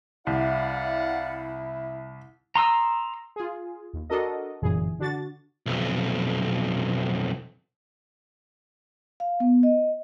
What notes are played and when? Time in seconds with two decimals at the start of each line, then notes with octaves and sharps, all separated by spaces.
0.27 C2 E4 D5 F5 F#5
2.56 A#5 C6 D#6 E6
3.36 F4 G#4
3.94 D#2
4.10 D4 F#4 A4 A#4 D#5
4.62 G1 F#2 A#2 E3 G#4
4.99 D3 D4 F#4 A6
5.66 B1 F2
9.20 F5
9.40 B3
9.63 D#5